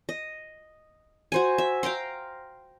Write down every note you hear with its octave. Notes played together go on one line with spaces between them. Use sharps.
D#5
F#4 C5 G#5
E5
F5 G5 A#5 C6